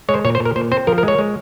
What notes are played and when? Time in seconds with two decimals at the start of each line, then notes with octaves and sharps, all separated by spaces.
0.09 G#3 C#5
0.14 C5
0.25 A#2 C#5
0.35 C5
0.40 A#2
0.45 A#4
0.56 A#2 C5
0.71 C4 C5
0.87 F3 A#4
0.98 A#4
1.03 G#3
1.08 C#5
1.19 G#3